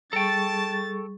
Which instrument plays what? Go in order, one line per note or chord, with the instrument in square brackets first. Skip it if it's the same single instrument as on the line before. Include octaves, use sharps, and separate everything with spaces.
[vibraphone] G3 G#4 C#6 [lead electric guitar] A4 G5 [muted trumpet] A5 [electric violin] A6